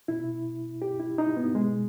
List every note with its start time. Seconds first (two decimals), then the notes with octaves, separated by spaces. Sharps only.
0.08 B2 E4
0.82 G4
0.99 E4
1.18 D#4
1.37 B3
1.55 B2 G#3